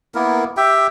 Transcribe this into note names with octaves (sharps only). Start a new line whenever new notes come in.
A#3 B3 E4 A#4
G4 E5 G5